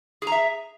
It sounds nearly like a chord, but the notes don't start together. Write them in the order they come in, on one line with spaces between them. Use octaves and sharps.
G#4 A#5 E5